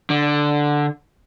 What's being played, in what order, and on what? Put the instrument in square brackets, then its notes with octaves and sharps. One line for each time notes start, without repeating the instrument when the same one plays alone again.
[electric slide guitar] D3